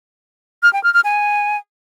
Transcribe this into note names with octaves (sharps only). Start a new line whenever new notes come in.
F6
G5
F6
F6
G#5